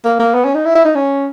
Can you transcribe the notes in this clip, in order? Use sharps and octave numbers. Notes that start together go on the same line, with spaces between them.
A#3
A#3
B3
C#4
D#4
E4
E4
D#4
C#4